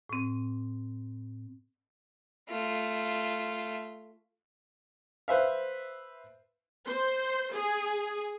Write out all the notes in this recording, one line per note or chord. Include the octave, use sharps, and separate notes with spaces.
A2 C4
A3 F4
B4 C5 E5 F5
C5
G#4